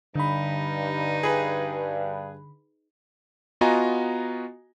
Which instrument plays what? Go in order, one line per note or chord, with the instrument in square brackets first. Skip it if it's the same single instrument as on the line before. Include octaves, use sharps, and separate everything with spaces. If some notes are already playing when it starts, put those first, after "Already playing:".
[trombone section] G2 [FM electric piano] D3 B5 [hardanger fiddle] D#4
[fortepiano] G#4 B4
[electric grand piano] B3 F4 F#4 D#5 G#5 A#5